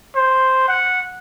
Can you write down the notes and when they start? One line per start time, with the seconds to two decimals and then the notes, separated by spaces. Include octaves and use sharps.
0.16 C5
0.68 F#5